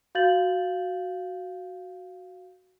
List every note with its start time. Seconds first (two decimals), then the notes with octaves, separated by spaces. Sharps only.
0.15 F#4 F5 G6 A6 F#7